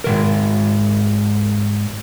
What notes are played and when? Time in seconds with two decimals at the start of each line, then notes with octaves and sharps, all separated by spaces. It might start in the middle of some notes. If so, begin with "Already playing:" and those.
0.04 G#2 C#3 A#4